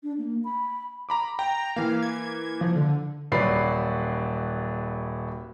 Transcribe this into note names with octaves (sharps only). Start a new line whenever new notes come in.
D4
A#3
B5
A#5 B5 D6
G5 A#5
E3 A#3 F5
G#6
F3
D3
D#1 F#3 B4 D5 B5 C7